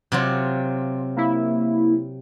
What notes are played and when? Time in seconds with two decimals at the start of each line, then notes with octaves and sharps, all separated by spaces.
0.12 C3 F#3 F4
1.16 A#3 E4